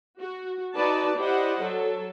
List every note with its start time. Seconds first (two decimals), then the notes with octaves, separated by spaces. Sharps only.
0.20 F#4
0.75 D#4 F#4 B4 D5 A5
1.18 E4 G4 C5 D5 D#5 F#5
1.62 F#3 A4